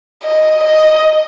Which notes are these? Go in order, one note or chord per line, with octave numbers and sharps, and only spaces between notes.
D#5
D#5